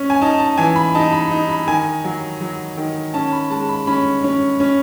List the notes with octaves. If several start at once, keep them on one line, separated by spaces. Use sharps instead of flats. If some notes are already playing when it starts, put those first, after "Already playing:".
Already playing: C#4
G#5
D#4 A5
A5
E3 G#5
B5
D#4 A5
B5
D#4
B5
D#3 G#5
F#3
F#3
D#3
C#4 A5
B5
G#3 A5
B5
C#4 B5
C#4
C#4